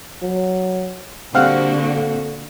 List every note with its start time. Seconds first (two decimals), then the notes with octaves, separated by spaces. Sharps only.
0.22 F#3
1.34 A#2 D3 G3 C4 F#4 F5 F#5
1.84 A4